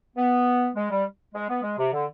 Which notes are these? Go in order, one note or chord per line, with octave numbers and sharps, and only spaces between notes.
B3
G#3
G3
G#3
B3
G#3
C3
D3